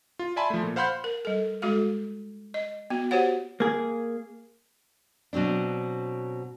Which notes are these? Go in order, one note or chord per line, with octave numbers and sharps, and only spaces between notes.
F4
D5 E5 G#5 A5 B5 C6
F3 A3
A#2
C5 F5 F#5 B5 C6 G6
A#4
G3 A4
G#3 F#4 A4 F5
D#5
B3 F#4
F#4 G4 C5 C#5 F#5
A#3 G#4
B2 F#3 C4 D4